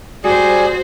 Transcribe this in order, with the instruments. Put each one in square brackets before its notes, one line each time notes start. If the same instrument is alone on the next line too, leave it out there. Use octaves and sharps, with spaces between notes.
[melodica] G3 G#4 [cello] F#4 C5